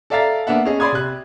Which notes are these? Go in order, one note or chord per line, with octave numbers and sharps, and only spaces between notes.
A4 D5 E5 F5 A#5 A6
A#3 B3 D4 E5 F#5
C#4 G#4 D#5
D5 B5 C6 D#6 G#6
C3 F#6